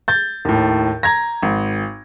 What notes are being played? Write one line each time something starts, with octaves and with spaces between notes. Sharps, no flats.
G6 A6
D#2 A2
A#5 G#6 A#6
G#1